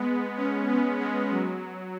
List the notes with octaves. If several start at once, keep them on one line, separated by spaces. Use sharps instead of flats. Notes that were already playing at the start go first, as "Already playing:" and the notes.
Already playing: G#3 B3
C#4
B3
G#3
F#3